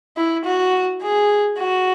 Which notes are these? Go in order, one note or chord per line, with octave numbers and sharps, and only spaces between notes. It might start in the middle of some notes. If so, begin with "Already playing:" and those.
E4
F#4
G#4
F#4